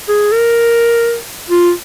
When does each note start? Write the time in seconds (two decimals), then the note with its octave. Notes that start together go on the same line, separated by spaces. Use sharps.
0.09 G#4
0.32 A#4
1.50 F4